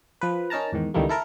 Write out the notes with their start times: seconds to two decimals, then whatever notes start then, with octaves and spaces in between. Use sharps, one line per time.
0.21 F3 B4
0.50 C#4 D#4 A#4 A5 A#5
0.72 E2 G#2 D#3
0.94 C#2 D#3 E3 G3 A3 A#3
1.09 E4 A4 A#4